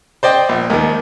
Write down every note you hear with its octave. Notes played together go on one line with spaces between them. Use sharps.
C5 D5 D#5 G5
A#1
D#2 D#3